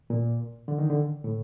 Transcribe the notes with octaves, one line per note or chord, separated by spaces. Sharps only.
A#2
D3
D#3
D3
A2